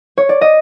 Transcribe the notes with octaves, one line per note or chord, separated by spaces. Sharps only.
C#5
D5
D#5